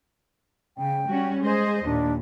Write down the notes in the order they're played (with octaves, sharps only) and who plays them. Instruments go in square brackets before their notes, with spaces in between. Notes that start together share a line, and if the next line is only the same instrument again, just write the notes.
[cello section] C#3 [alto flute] G5
[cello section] G3 C#4 F#4
[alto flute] G#3 [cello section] G#4 C5 D#5
[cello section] D#2 A#2 [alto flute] D4